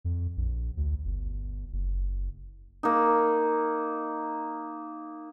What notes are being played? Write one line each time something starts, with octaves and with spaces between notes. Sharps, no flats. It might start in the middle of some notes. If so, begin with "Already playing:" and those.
F2
A#1
D2
G1
F#1
A#3 D#4